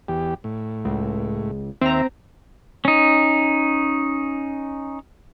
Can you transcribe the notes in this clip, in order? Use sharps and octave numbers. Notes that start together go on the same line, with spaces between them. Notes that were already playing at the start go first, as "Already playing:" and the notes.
E2 G4
A2
C#2
D#2 C4 C5 E5 A#5
C#4 D#4